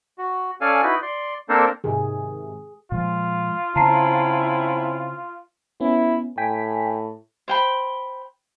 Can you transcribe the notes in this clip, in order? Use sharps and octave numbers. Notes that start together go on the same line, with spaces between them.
F#4
C#4 A4 D5 F5 G#5
D#4 E4 F#4 B4
D5 C6
A#3 C4 D4 A4 A#4 C5
G#2 C3 D#3 G#4
A#2 F3 G#3 F4
C#3 C4 C#4 E4 A5 A#5 C7
B3 C#4 E4
A2 G5 G#5 B6
C5 G5 B5